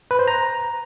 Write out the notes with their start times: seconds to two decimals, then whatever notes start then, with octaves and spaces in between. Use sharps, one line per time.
0.11 B4
0.19 C5
0.28 A#5